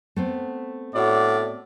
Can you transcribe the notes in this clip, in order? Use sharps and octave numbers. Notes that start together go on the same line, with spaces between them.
A3 B3 C4
A2 F#4 D5